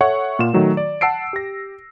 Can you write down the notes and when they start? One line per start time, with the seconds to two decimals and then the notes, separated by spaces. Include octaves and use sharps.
0.01 A4 C#5 E5 F#5 C#6
0.39 A#2 F4 E7
0.54 D#3 F#3 A3
0.77 D5
1.01 F#5 A5 E6 C7 D7
1.33 G4 A#6